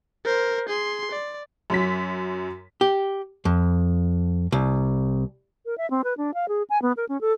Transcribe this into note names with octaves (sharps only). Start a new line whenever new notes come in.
A#4 C5
G#4 C6
D5
F#2 F#3 B6
G4
F2
C2
A#4
E5
C4
B4
D4
F5
G#4
G#5
B3
A#4
C#4
A4